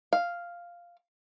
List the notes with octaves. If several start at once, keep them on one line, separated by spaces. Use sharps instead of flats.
F5